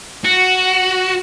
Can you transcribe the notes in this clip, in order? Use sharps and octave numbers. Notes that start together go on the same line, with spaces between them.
F#4